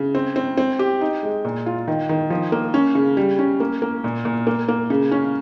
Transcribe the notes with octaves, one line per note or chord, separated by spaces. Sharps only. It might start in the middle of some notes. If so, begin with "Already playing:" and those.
Already playing: C#3
C4
C4
C4
G4
D#4
G#3
A#2
F4
D#3
D#3
F3
A#3
C#4
C#3
G3
C#4
A#3
A#3
A#2
A#2
A#3
A#3
C#3
C#4